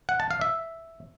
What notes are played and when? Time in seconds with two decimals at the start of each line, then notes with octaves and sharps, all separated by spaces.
0.09 F#5
0.20 A5
0.31 F5
0.41 E5